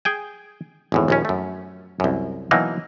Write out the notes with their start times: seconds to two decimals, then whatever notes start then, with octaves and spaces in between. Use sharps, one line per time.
0.05 G#4 G5 G#5
0.92 G#1 E2 A2
1.08 A#1 D#2 C#4
1.25 F#2 A3
2.00 C2 F#2
2.51 B2 E3 F#3 A#3 D#4